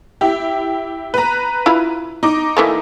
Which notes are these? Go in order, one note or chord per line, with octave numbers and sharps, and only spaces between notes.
E4 G4
B4 A#5
E4 F4 B5
D#4 D6
E3 A3 A#3